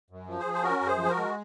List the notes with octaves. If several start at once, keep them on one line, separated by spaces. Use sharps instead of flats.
F#2
F3
G#4 C5
F3
C5
C#4 F#4 A#4
F#2
G#4 C5
F3
G#4
F#4 A#4
G#3